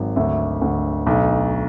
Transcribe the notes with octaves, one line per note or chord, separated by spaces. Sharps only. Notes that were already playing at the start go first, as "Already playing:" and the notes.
Already playing: G#1 F#3
D2 E5
D2
B1